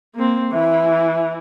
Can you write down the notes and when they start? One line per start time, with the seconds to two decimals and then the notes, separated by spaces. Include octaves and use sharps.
0.15 A#3 C4
0.52 E3 E4 E5